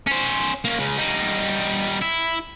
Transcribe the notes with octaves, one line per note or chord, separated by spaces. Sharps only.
C#4 C5
A#3 C#4
C#2 C#3
G3 D#4
E4